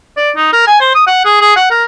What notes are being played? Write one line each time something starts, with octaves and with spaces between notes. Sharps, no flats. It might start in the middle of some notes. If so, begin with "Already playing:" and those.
D5
D#4
A#4
G#5
C5
D#6
F#5
G#4
G#4
F#5
A#4